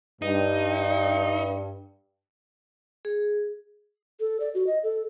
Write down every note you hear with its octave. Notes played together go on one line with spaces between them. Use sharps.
G2 D#4
G#4
A4
D5
F#4
D#5
A4